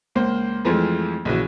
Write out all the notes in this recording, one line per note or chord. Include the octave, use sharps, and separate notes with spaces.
C#2 A#3 C5
F2 E3 F3 G#3 A3
A#1 C#3 E3 F#4